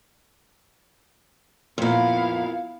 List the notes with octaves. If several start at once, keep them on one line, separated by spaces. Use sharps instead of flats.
F2 A#2 B3 E4 F5